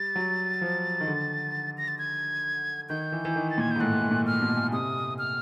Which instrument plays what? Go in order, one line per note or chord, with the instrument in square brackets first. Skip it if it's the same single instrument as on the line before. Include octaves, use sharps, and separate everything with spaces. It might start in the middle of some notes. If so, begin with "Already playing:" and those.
Already playing: [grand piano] G3 [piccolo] A6
[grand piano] F#3
F3
D#3
D3
[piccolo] A#6
A6
G#6
[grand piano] D#3 [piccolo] G6
[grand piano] E3
E3
D#3
[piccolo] A6
[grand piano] A#2 [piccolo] G#6
[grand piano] G#2 [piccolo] G6
[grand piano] A2 [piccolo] F#6
[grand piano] A2
A#2
[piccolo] F6
[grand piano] B2
[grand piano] C3 [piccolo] D#6
[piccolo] F6